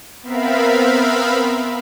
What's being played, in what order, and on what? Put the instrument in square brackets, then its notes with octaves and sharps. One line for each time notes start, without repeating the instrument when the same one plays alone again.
[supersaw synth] B3 C4 A#4 E5 F5 B5